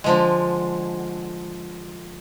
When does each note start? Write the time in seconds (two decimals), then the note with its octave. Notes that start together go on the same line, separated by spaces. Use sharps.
0.04 D3 F3 G#3